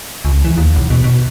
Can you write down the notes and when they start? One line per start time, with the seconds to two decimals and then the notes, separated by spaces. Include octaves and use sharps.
0.25 C#2
0.45 E3
0.57 D#2
0.76 B1
0.90 B2
1.04 B2